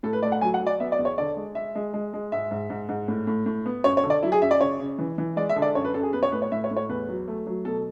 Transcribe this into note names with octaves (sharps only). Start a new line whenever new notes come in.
A2 A4
B4
A3 D5
F#5
F#3 G#5
F#5
F#3
D5
B3 E5
D5
E2
C#5
D3 D5
G#3
G#3 E5
G#3
G#3
G#3
G#2 E5
G#2
G#2
G#2
A2
A2
A2
B3
F#2 C#5
C#5
D3
D5
F#3 E4
G#4
F#2 E5
D5
C#3 C#5
C#3
E3
E3
G#3 D5
E5
D3
D5
F#2 C#5
B4
F#2 A4
G#4
B3 B4
C#5
A2 B4
C#5
A2 E5
C#5
A2
C#5
E2 B4
F#3
A3
F#3
B2 A4